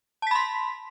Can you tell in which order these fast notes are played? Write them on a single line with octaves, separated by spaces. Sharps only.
A5 B6 B5 C6